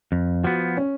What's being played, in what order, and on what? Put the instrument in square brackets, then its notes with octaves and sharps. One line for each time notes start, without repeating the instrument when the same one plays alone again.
[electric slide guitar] F2
[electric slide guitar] F3 B3 [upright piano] F#4
[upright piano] C#4